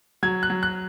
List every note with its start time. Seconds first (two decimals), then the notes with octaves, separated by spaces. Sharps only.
0.23 F#3 G#6
0.43 F#6
0.50 F#3
0.63 F#6